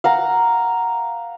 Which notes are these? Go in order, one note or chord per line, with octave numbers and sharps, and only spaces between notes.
F5 F#5 A#5